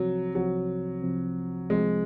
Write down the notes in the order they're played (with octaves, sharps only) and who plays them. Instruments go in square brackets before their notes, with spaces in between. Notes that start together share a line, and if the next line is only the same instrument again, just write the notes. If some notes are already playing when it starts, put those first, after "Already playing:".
Already playing: [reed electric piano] C2 C3 F3 C4 [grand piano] F#3
[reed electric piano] C2 C3 F3 C4 [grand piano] F#3
[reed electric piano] C2 C3 F3 C4
[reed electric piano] C2 C3 F3 C4 [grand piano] G#3